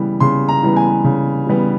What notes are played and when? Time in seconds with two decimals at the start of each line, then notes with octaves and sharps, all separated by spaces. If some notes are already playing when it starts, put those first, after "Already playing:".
Already playing: C#3 E3 G3 B3
0.20 C#3 C6
0.49 A#5
0.63 E3 G3 B3
0.76 G#5
1.04 C#3
1.47 E3 G3 B3